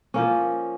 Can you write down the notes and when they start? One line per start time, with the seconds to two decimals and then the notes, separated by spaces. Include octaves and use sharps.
0.14 F3 A#3 C#4